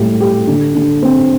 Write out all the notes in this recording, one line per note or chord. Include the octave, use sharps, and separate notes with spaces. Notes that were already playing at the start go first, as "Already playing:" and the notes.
Already playing: A2 G3 G4
G4
D3
D3
C4